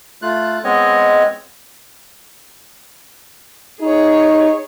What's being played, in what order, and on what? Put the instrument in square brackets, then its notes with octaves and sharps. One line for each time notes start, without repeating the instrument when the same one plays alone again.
[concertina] A3 F4 F#6
G#3 B3 C4 C#5 D#5
[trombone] D#4 [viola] G#4 C#5